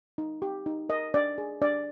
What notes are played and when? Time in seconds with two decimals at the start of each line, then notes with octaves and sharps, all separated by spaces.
0.18 D#4
0.42 G4
0.66 D#4
0.89 A#4 D#5
1.14 D4 D5
1.38 G#4
1.61 D4 D5